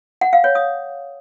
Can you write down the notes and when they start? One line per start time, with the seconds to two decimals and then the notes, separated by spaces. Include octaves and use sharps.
0.21 F#5
0.33 F5
0.44 C#5
0.55 D#6